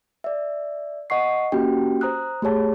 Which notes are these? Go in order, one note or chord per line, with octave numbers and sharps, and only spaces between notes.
D5 E5
D#5 F#5 C#6 C7
A#3 C#4 F#4 G4 G5
C5 A#5 D#6 F#6
A3 G4 G#4 C#5 A5